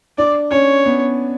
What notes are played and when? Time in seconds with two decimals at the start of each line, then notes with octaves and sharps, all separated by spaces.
0.18 D4 D5
0.51 C#4 C#5
0.86 B3